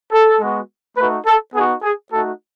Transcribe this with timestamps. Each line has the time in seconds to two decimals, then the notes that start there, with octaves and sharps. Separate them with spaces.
0.12 A4
0.40 G#3 B3 F#4
0.97 A3 D#4 F#4 B4
1.26 A4
1.54 B3 D#4 F#4 G#4
1.82 G#4
2.11 A3 D#4 F#4 A4